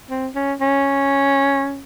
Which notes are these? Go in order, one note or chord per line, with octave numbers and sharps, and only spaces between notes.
C4
C#4
C#4